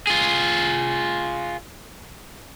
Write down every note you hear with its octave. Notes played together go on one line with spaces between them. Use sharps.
F4 G#4